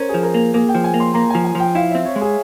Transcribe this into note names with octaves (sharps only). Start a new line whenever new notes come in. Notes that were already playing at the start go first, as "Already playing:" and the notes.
Already playing: C#4 A#4 C5
F3 G#4
A#4
A#3
A#3 G#4
G5
F3
G#5
A#3
C6
A#3 A#5
F3 G#5
G#5
F3 G5
E4 F5
C4 E5
C#5
G#3
G#4